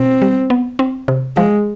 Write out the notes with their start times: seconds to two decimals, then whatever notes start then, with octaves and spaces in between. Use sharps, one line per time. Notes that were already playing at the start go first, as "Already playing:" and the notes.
Already playing: B2 C4
0.22 G3
0.50 B3
0.79 C4
1.08 C3
1.36 F3 G#3